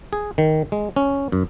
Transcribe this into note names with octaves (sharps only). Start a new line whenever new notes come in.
G#4
D#3
G#3
C#4
F#2